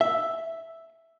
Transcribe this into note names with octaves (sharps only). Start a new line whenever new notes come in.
E5